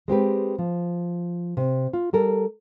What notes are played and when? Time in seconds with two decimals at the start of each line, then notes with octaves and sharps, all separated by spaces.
0.08 G#3 C4 G4 B4
0.59 F3
1.57 C3
1.93 F4
2.13 G3 A4 A#4